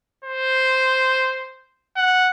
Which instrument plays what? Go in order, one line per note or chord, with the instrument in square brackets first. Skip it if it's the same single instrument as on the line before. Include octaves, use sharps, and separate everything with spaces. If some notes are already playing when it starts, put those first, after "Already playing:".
[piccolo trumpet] C5
F#5